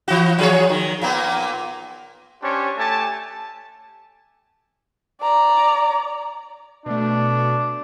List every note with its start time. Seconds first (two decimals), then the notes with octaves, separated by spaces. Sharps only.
0.08 E3 F#4
0.39 F3 G#4 C#5
0.69 D#3
1.02 A#2 A#3 B3
2.42 C#4 D4 G4 C5 C#5
2.77 A3 G4 G#5 A5
5.22 D5 A#5
6.86 B2 A3 D4